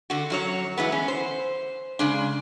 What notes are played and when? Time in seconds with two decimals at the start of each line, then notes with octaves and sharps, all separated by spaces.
0.10 D3 F#4
0.30 F#2 F#3 C#5
0.78 E3 G#3 B3
0.92 C#4
1.08 C5
1.99 C#3 G#3 D4